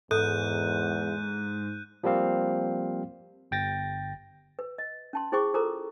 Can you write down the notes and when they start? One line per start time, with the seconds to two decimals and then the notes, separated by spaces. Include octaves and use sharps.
0.11 E2 G#2 A4 F#6 G6 D#7
2.03 F3 G3 A#3 C4 F5
3.51 G1 G5 A6 A#6
4.59 B4
4.78 D#5
5.13 C#4 A5 C6
5.32 E4 G#4 C5 G5 C#6 D6
5.54 F4 A4 A#4 C5 A#5 D6